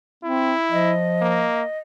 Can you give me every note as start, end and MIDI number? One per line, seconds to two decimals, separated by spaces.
0.24 0.54 60
0.24 0.92 64
0.72 1.48 53
0.72 1.79 75
1.21 1.63 58